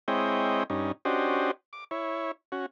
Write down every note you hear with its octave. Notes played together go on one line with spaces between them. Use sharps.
G#3 C4 E4 C#5 D#5 G5
G2 C#4 D#4
C#4 D4 F#4 G4 C5 D#5
D6
E4 C#5
C#4 F#4